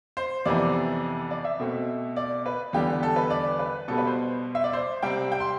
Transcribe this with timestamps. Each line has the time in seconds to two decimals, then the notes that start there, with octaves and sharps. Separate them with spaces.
0.17 C5
0.45 F2 C3 E3 B3 D5
1.31 D5
1.45 E5
1.60 B2 A3 C4
2.16 D5
2.46 B4
2.73 E2 D3 G3 G4
3.03 A4
3.16 B4
3.30 D5
3.59 B4
3.88 B2 G3 B3 A4
3.98 B4
4.07 C5
4.55 E5
4.64 D5
4.73 C5
5.03 C3 G3 C4 G5
5.32 G5
5.40 C6